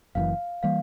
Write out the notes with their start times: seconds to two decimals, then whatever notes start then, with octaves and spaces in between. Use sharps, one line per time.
0.15 F#1 F#2 C#3 E3 F5
0.63 E3 G3 A#3 F5